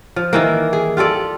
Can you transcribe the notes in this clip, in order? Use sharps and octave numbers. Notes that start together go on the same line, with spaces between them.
F3
D#3 E3 A#3
G#4
F4 G4 A4 D5